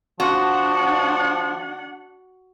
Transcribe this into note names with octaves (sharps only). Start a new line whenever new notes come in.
F3 D4 F#4 F#5